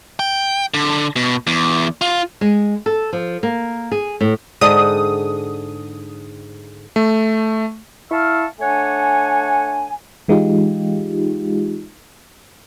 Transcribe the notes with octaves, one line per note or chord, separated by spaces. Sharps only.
G5
D3
B2
E2
F4
G#3
A4
F3
A#3
G#4
A2
G#2 D3 G5 D#6
A3
E4 F5 A5 C#6 E6 F6
A3 D4 C#5 F#5 G#5
E3 G#3 D#4 F4 G4